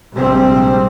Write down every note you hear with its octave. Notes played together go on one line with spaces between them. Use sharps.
A#1 C3 G3 G#3 C4